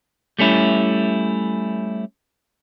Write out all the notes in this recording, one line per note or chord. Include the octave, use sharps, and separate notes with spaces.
G3 A3 C#4 E4